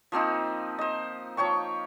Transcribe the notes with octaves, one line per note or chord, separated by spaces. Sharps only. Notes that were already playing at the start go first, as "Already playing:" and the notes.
F3 A#3 C4 D#4
C5 D#5
F3 C#5 G5 C#6